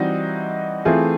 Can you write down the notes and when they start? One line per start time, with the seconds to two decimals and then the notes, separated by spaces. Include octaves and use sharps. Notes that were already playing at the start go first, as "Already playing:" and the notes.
Already playing: E3 G3 C4 D#4 F#4
0.85 E3 A3 C4 F4 G#4